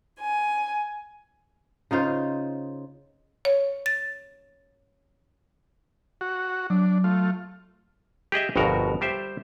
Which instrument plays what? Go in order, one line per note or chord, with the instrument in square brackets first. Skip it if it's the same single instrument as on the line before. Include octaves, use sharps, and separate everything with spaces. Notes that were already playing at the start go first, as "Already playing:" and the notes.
[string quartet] G#5
[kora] C#3 D#4 F4 C5
[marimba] C#5
A6
[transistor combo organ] F#4
[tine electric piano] F#3 [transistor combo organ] D4
[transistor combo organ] A3 F4
[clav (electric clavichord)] G4 G#4 D#5 E5
G1 F2 B2 F#4 A#4
G3 G4 C5 E5